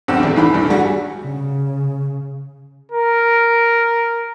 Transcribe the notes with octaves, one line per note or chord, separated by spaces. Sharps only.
D#1 B1 G2 C4 F#5 E6
A#1 E2
C2 E3 B5
D#1 G2
G3 F#4 G#4 F#5
C#3
A#4